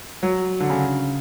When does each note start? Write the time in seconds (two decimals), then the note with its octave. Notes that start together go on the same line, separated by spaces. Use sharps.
0.23 F#3
0.60 D3
0.70 C#3